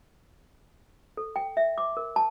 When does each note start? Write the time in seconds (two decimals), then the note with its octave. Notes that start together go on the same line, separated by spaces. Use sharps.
1.17 A4
1.36 G5
1.57 E5
1.78 D6
1.97 A#4
2.16 A5